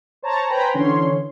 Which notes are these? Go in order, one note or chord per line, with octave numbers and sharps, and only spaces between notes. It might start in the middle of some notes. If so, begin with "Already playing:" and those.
C5 C#5 A5 A#5
B4 C5 G5 G#5 A#5 B5
D3 E3 C#4 C#5 C6